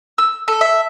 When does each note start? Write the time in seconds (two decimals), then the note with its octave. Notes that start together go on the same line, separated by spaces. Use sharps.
0.18 E6
0.48 A4
0.61 E5